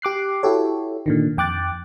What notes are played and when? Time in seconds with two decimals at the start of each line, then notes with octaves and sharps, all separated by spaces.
0.02 G4 D6 F#6 C7
0.43 E4 F#4 G4 A4 C#5
1.06 A#2 D3 D#3
1.37 F2 G5 D6 F#6 A6